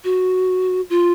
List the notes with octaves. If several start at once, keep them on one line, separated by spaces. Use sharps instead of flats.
F#4
F4